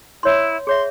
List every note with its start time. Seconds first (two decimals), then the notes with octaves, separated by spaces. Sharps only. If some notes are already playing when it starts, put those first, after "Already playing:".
0.23 E4 C#5 C6
0.67 G#4 C#5 E5 C6